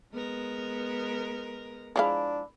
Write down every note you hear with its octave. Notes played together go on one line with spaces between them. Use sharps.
G#3 B3 A#4
F3 G#3 D4 E4 F5 A#5